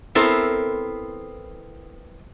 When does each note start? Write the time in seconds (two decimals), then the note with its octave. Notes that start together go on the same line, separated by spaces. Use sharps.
0.15 B3 C4 E4 A4 A#4 C5